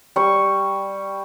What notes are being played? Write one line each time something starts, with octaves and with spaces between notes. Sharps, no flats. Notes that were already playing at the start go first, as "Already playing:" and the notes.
G3 C#6